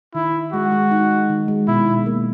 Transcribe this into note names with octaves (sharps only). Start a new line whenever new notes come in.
D#3 E4
D#4
G#3 F#4
G#3
D#4
G#3
D#3
G#3
B2 E4
B2
A#3